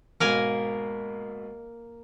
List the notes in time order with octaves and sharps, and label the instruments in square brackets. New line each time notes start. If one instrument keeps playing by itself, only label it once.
[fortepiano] G#2 B2 [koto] A#3 A#4 G#5